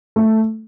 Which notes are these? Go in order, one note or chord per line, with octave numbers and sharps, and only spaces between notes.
A3